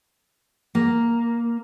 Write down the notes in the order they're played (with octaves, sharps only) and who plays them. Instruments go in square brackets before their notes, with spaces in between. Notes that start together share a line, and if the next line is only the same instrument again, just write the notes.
[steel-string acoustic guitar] A#3